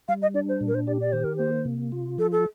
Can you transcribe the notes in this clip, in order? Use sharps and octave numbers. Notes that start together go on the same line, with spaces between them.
G3 F5
D#5
D4 D5
C5
A#2
A#4
C5
G4 D5
D5
D#3 C5
A#4
A#3 C5
C3
F4
F3 A4
A4